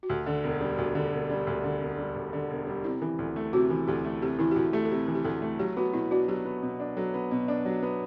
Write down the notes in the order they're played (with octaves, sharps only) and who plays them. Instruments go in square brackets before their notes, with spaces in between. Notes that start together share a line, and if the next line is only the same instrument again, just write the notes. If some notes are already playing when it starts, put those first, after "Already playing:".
[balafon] F#4
[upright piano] D2 [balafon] G4
[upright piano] D3
E1
G3
[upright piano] D2 [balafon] F#4
[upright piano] D3
E1
G3
D2
D3
E1
G3
D2
D3
E1
G3
[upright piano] C3 [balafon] E4
[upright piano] E3
D2
A3
[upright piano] C3 [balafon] F#4
[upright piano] E3
[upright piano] D2 [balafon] G4
[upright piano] A3
[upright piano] C3 [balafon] G4
[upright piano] E3 [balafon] E4
[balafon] G4
[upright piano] D2 [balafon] F#4
[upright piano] A3 [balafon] G4
[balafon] A4
[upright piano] C3 [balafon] G4
[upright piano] E3
[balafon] G4
[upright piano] D2 [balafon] A4
[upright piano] A3
[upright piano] F#3 [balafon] G4
[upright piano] B3 [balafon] F#4
[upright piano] B2 [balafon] E4
[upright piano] D4 [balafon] F#4
[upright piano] F#3 [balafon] G4
[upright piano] B3
B2
D4
[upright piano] F#3 [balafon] A4
[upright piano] B3
B2
D4
[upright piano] F#3 [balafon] G4
[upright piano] B3